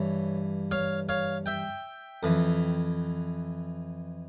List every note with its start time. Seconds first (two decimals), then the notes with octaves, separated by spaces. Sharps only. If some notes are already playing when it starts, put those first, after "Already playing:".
Already playing: G2 E3 C#5
0.71 C#5 F5
1.09 C#5 F5
1.46 E5 G5
2.23 F2 E3